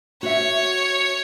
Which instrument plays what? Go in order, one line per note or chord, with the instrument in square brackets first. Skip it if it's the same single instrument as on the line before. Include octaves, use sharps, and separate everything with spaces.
[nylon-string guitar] F#4 E5 [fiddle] C#5